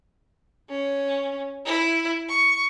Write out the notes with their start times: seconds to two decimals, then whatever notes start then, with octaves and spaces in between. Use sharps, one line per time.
0.71 C#4
1.66 E4
2.29 C#6